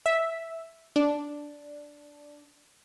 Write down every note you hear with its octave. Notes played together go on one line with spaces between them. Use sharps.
E5
D4